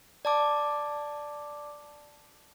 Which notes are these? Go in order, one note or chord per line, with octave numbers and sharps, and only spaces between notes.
D5 A5 D6